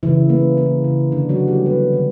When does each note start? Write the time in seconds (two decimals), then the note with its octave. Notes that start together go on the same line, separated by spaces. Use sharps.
0.03 C#3 E3 E4
0.29 A#3
0.57 A#3
0.84 C#3
1.12 D3 D4
1.29 F#3 F#4
1.39 A#3
1.48 G3 G4
1.66 A#3 B3 B4
1.93 D3